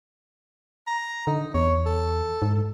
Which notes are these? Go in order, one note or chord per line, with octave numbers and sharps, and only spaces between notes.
A#5
D3 D#4
E2 C#5
A4
G#2